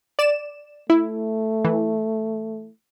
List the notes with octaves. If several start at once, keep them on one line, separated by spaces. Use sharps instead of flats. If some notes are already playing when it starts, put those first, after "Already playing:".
D5 E7
A3 E4
E3